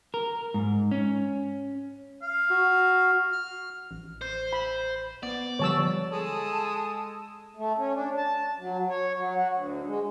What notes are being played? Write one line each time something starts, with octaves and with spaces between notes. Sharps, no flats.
A#4
G#2
C#4
F5
F#4
F6
A1
C5
B5
B3 D5
D3 F3 G3 C#5 A5 E6
G#3 A4 A5 D#6
A3
C#4
D4
A5
F#3
C#5
F#3
F#4
D2
G#3